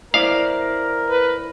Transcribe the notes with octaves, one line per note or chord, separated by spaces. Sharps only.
E4 A#4 C5 D5 F5
B4